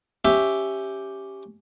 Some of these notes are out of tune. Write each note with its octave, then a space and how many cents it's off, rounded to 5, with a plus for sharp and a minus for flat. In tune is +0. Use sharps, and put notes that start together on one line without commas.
C#4 +0 G4 +0 E5 +0